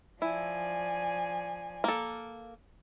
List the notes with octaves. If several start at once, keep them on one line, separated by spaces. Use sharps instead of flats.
F3 E4 D5 G#5
A#3 A4